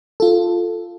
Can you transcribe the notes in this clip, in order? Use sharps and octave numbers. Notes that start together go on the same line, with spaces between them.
F4 A4